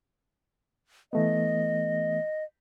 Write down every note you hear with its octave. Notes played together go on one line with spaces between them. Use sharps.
E3 A3 B3 D#5